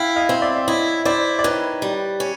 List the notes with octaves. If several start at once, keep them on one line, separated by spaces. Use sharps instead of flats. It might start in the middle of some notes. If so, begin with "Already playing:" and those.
Already playing: E4 F5 G5
D#5 F5
C4
D5 E5
E5
E4 C#5 D#5
E4 C5 D5
D5
D#3 B4 C#5
G3
C#4